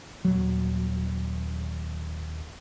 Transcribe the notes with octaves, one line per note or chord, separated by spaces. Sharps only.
D#1 F#3